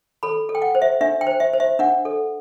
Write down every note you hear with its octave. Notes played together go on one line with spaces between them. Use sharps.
A4 B5
A4
G5
F#5
C5
E5
D4 E5
G5
C5
E5
C5
E5
D4 F#5
A4